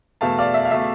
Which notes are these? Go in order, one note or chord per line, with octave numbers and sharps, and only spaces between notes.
E2 B2 A3 F5 A5
D5 F5
E5
F5
B2 A3 E5